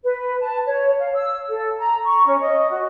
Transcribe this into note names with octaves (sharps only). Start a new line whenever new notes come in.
B4
A5
C#5
F5
E6
A4
A#5
C#6
C#4
D#5
F#4